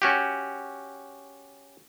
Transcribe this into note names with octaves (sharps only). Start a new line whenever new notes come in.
C#4 F#4 G4